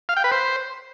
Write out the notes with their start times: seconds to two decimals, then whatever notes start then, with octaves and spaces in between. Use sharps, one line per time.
0.09 F5
0.16 G5
0.24 B4
0.32 C5